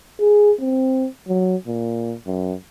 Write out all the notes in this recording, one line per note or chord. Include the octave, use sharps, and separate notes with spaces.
G#4
C4
F#3
A#2
F#2